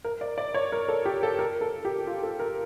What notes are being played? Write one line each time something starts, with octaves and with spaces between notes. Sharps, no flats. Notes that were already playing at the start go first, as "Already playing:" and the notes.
A#4
D5
D5
C#5
A#4
A4
G4
A4
A#4
A4
G4
F4
A4
A#4